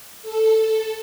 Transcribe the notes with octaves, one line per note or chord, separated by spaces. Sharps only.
A4